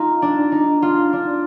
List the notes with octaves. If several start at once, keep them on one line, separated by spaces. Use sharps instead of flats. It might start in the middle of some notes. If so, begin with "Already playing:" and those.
Already playing: D#4 F4
D4
D#4
F4
D4